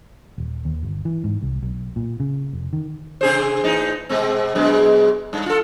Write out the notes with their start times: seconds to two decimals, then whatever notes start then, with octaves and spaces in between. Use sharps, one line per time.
0.38 D#1
0.65 D#2
0.83 G1
1.05 E3
1.24 G#2
1.42 C2
1.62 B1
1.96 A#2
2.20 C#3
2.53 F1
2.73 D#3
3.21 C3 G#4 C5
3.64 A2 E3 D#4
4.09 B2 G#3 C4
4.55 F#2 B2 G#3
5.33 G2
5.46 F4 A4